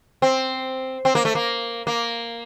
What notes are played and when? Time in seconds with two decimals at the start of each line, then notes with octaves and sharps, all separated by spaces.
0.22 C4
1.05 C4
1.15 A#3
1.25 A3
1.35 A#3
1.87 A#3